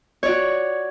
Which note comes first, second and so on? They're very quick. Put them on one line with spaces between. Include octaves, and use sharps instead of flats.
C#5 D5 F#4